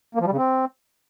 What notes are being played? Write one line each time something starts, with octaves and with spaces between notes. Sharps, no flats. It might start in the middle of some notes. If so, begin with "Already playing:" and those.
A#3
F3
G3
C#3
C4